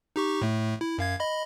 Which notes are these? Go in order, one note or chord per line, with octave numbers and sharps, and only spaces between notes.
D#4 G4 C#6
A2 A3
E4
F#2 F5 G#6
D#5 B5